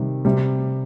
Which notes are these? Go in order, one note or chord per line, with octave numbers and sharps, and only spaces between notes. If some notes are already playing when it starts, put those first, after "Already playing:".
Already playing: C3 D#3 G3
C3 G3